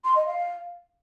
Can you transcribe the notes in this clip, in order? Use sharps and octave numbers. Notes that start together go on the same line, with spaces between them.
C6
D#5
F5